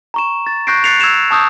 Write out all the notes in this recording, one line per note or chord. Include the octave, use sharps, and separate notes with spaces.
A#5 C#6 E7
A6
C#6 F#6 G6 A#6 C7 D7
F#6 A6 C7 C#7 F7
E6 G#6 C7 E7 F7
A5 C#6 D#6 E6 G6